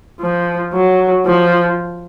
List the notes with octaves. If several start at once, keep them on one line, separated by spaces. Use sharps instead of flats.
F3
F#3
F3